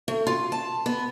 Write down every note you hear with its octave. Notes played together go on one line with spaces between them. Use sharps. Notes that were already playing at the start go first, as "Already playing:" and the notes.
A3
F4
A5
B3